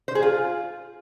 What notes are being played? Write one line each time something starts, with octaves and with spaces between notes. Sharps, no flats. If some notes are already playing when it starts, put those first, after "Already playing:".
C5
G#4
F4